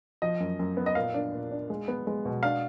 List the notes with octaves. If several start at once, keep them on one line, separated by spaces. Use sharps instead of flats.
F3 D#5
F#2
F#2
B3
D#5
A#2 F5
D4
A#2
D4
G#3
B3
G#3
B2
D4 F5